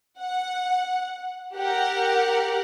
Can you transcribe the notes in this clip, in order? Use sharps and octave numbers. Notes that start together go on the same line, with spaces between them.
F#5
G4 A#4 F#5